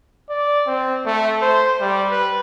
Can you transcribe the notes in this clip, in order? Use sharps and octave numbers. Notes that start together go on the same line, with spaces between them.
D5
C4
A3
C5
G3
B4